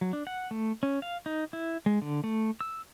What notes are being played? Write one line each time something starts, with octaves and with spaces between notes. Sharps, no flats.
F#3
D4
F#5
A3
C#4
F5
D#4
E4
G#3
D3
A3
E6